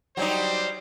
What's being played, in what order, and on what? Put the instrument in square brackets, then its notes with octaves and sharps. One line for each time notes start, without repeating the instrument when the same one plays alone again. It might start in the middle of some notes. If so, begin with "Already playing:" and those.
[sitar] F#3 G3 D#4 [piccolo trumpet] C5